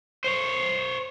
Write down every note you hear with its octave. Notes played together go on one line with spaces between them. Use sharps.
C5 C#5